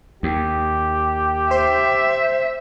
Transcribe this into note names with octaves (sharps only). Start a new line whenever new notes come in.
D#2 G4
C5 E5